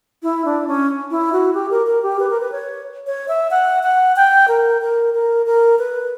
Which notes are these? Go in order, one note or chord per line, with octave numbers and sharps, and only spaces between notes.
E4
D4
C#4
E4
F#4
G4
A#4
A#4
G4
B4
A#4
B4
C#5
C#5
E5
F#5
F#5
G5
A#4
A#4
A#4
A#4
B4